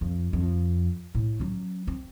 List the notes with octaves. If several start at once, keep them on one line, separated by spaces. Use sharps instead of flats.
F2
F2
A2
F#3 C#4
C4